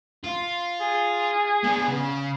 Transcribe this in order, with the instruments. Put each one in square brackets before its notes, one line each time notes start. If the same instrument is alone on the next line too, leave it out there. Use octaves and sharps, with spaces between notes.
[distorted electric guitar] F4
[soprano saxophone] G#4
[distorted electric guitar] B3 D4
C#3